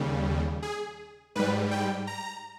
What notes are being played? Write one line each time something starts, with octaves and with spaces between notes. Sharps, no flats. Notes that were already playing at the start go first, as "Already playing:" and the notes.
Already playing: D#2 C#3 G3
G#4
G#2 G3 B4
G5
A#5